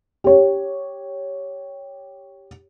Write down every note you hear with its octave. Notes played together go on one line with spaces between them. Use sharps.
G4 C#5